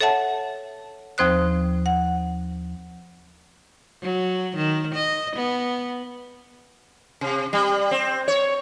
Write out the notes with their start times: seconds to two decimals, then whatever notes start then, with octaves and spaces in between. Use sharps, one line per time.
0.01 A4 C#5 E5 F#5 A5
1.18 D#2 F3 C4 C5 D#6 F#6
1.86 F#5
4.02 F#3
4.56 D#3
4.95 D#5
5.36 B3
7.21 C3
7.53 G3
7.91 C4
8.28 C#5